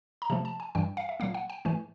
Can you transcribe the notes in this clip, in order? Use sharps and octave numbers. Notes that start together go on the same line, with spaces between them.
A#5
C3 F3 A3 A5
A5
G#5
G2 E3 G3 G5
F5
E5
A#2 F#3 A#3 F5
F#5
G5
A2 E3 A3 G#5